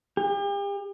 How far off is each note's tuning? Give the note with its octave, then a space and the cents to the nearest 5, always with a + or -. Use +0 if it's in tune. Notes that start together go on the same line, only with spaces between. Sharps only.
G4 +40